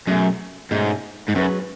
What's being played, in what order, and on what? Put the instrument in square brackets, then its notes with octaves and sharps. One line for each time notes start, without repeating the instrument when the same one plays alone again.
[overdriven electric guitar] F#2 [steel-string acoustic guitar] B2 A3 C#4 G#4
[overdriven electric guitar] G#2 [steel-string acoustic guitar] B2 A3 C#4 G#4
[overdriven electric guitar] G#2
[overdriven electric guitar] F#2 [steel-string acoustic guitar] F#3 C#4 G#4 B4